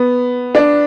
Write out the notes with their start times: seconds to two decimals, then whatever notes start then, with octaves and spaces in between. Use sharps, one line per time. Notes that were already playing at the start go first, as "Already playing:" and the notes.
Already playing: B3
0.55 D4